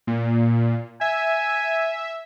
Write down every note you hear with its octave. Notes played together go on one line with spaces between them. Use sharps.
A#2
E5 G#5